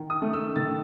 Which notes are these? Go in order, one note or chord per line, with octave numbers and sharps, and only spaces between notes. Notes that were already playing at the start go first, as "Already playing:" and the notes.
Already playing: D#3
D#6
A3
E6
D#3 A6